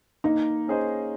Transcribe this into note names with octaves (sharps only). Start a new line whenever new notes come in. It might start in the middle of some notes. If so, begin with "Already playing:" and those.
A#3 D#4
C#4 G#4 C5 D#5